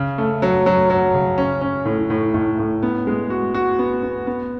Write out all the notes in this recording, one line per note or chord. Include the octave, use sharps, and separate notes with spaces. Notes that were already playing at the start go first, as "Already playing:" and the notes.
Already playing: C#3
A3
F#3
F#3
F#3
C#3
C#4
C#4
A2
A2
A2
A2
B3
G#3
F#4
F#4
B3
B3
B3